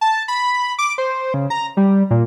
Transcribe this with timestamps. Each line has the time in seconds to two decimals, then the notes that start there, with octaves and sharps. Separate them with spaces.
0.01 A5
0.28 B5
0.79 D6
0.98 C5
1.34 C#3
1.50 A#5
1.77 G3
2.11 A#2